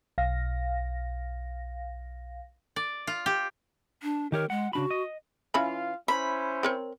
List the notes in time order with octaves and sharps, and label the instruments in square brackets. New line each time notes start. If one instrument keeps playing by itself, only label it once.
[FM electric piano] B1 F5 A#6
[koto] D5
F4
G4
[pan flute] D4
[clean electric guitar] D#3 G4 C#5 [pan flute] A#4
[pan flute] G#3 [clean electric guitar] F#5
[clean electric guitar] C#3 D4 B5 [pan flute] F#4
[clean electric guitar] D#5
[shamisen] E3 C#4 B5 [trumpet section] F4 F5
[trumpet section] C#4 E4 C5 [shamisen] E5 [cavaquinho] B5
[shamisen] C4 A#4 C#5